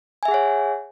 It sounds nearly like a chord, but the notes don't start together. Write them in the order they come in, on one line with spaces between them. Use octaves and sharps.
G#5 E5 G#4 F#5 C#5